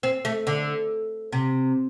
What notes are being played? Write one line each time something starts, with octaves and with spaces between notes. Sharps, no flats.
C4
A3
D3
C3